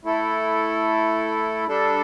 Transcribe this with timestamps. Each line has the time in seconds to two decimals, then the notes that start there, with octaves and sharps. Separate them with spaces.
0.04 A3 E4 A4
1.67 G3 D4 A4